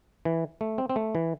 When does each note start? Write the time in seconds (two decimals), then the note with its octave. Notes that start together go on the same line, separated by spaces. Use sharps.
0.25 E3
0.61 A3
0.78 C4
0.90 C4
0.96 A3
1.15 E3